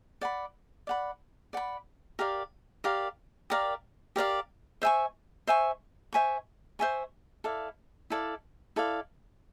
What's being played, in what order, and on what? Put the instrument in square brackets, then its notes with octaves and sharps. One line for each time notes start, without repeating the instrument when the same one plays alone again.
[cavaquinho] D5 F#5 B5
D5 F#5 B5
D5 F#5 B5
G4 A#4 D5 F5
G4 A#4 D5 F5
G4 A#4 D5 F5
G4 A#4 D5 F5
C5 E5 G#5 C#6
C5 E5 G#5 C#6
C5 E5 G#5 C#6
C5 E5 G#5 C#6
E4 A4 D5 F5
E4 A4 D5 F5
E4 A4 D5 F5